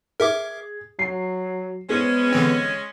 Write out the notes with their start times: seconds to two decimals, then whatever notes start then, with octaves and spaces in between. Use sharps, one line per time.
0.20 G#4 A#4 E5 D6
0.99 F#3 C7
1.90 G#3 B3 C#4 G#4 C5
2.33 D3 E3 C4